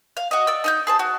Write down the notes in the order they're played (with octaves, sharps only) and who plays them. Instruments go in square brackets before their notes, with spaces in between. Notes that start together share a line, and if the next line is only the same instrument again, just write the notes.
[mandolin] F5
F#4 D#5
D5 E6
D#4 D#6 G6
G#4 C5 A5
F#4